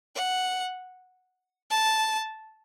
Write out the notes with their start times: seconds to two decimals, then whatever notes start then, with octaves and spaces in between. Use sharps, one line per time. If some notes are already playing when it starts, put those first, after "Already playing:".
0.15 F#5
1.70 A5